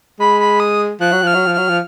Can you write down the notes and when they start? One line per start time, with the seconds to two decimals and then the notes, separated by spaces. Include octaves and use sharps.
0.20 G#3 B5
0.40 B5
0.60 D#6
1.00 F3 F#6
1.12 F#3
1.23 F3 F6
1.35 F#3
1.47 F3
1.54 F#3 F6
1.69 F3